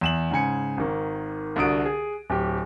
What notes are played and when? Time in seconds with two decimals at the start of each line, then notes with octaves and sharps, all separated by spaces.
0.01 E2 E7 F#7
0.31 G#2 C#3 G#5 C#7
0.77 G#1 D#3
1.56 C2 D3 F#4 D#6 D7
1.86 G#4
2.30 D1 G4